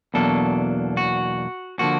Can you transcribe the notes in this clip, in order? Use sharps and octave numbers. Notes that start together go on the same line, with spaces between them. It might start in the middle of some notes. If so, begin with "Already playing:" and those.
E2 B2 F#3 A#3 D4 A4
F#4
D3 F3 A#3 F#4